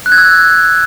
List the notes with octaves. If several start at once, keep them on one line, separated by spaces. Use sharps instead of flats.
F#6
G#6
E6